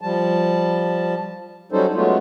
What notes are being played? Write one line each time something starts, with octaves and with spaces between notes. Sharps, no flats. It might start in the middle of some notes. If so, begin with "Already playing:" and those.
F3 G3 A5
F#3 G3 C#4 D#4 A4 C5
F#3 G#3 A3 B3 C#4 F4